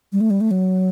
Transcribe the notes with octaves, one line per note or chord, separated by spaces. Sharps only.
G3
A3
G3
A3
F#3